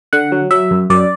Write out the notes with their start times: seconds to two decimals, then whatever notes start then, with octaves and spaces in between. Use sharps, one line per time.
0.13 D3 F#5
0.32 F#3
0.51 F#3 E5
0.71 F#2
0.90 F#2 D5